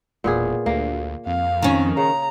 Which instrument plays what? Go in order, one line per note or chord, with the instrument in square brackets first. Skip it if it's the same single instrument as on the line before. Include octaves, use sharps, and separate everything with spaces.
[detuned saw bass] E1 [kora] A#2 B3 G#4
[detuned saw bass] D2 [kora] A#3
[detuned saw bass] F2 [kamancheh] F5
[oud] D#3 C#4
[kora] C#3 [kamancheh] A#5